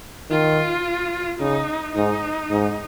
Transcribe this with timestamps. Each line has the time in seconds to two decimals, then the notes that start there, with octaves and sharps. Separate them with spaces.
0.30 D#3 F4
1.40 C#3 D#4
1.95 G#2 D#4
2.50 G#2